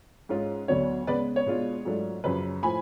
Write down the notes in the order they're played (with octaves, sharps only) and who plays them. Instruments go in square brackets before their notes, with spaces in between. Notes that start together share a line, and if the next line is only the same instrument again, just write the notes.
[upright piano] G#2 G#3 C#4 F4
D2 D3 F#3 B3 D4 C#5
C#3 G#3 B3 B4 D5
C#5
B2 G#3 D4 F4
G#2 F#3 A3 D4 F4
F#2 C#3 F3 B4
A2 F3 G#5 B5